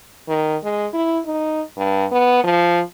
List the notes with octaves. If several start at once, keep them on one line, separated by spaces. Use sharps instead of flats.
D#3
G#3
E4
D#4
G2
B3
F3